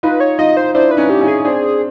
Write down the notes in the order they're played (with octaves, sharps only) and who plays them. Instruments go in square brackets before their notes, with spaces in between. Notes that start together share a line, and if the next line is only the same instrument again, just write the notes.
[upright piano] D#4 F4 [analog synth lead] B4
[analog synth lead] C#5
[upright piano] D#4 F4 [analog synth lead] D#5
[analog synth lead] C5
[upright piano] D4 E4 [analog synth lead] C5
[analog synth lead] B4
[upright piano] C#4 D#4
[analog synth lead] G4
[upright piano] C#4 D#4
[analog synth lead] G#4
[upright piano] C4 D4 [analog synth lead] G#4